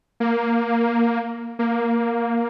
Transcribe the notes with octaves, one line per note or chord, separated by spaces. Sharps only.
A#3
A#3